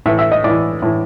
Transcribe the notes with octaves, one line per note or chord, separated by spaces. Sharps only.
A2 E3 E5
E5
D#5
A2 E3 D5
A2 E3